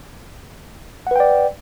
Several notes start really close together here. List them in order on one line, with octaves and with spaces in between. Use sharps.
F#5 B4 G5 D5